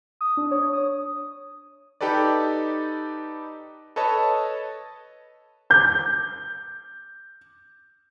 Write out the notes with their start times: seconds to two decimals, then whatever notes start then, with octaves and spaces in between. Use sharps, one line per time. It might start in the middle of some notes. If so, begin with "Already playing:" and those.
0.21 D#6
0.37 D4
0.51 C#5
0.73 D#6
2.01 D#4 G4 A4 B4 D5
3.96 A4 B4 C#5 D#5 A5
5.70 D6 G6